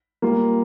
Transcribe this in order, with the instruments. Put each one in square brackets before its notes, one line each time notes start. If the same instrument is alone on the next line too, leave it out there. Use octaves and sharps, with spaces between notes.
[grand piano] G3 A#3 F4